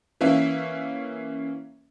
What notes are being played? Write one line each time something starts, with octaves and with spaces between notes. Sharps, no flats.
E3 A#3 C#4 E5